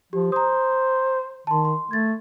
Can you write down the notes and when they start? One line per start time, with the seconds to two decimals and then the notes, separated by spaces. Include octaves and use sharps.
0.13 F3 G4
0.32 C5 A#5 D#6
1.47 D#3 A5 C6
1.65 C6
1.91 A3 G#6 A6